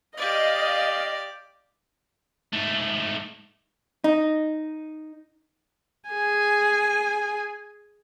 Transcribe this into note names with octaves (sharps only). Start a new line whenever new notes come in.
G4 D5 D#5 F5
G#2 A3
D#4
G#4 G#5